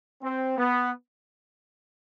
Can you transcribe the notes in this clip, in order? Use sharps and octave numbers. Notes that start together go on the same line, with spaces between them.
C4
B3